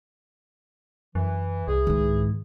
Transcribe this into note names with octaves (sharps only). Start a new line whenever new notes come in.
F#2 E3
C2 E3 G#4
G#2 D#3